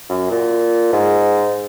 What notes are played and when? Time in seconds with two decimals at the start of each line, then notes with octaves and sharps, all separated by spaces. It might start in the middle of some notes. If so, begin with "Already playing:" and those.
0.09 F#2
0.30 A#2
0.92 G#2